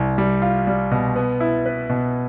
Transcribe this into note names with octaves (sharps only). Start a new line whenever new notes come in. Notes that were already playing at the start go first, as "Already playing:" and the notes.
Already playing: C2
G3
F4
G3
B2
B3
E4
B4
B2